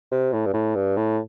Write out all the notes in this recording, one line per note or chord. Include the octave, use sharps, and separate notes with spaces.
C3
A2
G2
A2
G2
A2